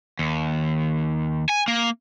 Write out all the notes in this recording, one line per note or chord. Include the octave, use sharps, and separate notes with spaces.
D#2
G#5
A#3